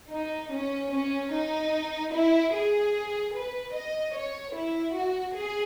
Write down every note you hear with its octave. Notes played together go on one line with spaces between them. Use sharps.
D#4
C#4
C#4
D#4
E4
G#4
B4
D#5
C#5
E4
F#4
G#4